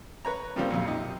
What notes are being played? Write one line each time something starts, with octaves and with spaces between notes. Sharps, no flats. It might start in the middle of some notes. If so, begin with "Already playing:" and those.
B4 C#5 A#5
G2 C#3 F3 G3 A#3 C4
B1 F2 A#2
C3 D#4